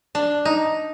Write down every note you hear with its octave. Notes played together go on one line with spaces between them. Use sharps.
D4
D#4